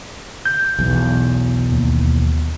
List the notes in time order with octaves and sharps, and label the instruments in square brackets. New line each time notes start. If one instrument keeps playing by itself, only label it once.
[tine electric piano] G6
[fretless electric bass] B1 E2
[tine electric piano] D#2